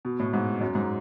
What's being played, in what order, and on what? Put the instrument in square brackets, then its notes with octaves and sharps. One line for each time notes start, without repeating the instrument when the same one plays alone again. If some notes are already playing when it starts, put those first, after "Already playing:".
[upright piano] B2
A2
G#2
F#2
G#2